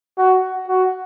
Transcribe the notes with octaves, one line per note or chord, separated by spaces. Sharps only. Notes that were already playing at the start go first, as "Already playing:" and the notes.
F#4
F#4